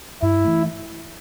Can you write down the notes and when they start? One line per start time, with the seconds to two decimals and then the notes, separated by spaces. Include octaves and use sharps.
0.22 G2 E4
0.44 E3 A3